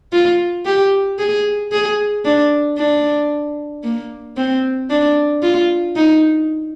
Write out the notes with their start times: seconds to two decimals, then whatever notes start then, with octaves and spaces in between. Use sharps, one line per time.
0.13 F4
0.66 G4
1.19 G#4
1.72 G#4
2.25 D4
2.78 D4
3.83 A#3
4.37 C4
4.90 D4
5.42 F4
5.96 D#4